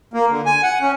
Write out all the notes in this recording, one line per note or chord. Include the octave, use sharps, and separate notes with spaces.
A#3
D3
G#5
F#5
C#4